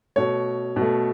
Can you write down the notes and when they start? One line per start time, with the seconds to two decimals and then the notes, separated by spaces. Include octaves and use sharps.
0.16 B2 A3 C#5
0.76 B2
0.82 A3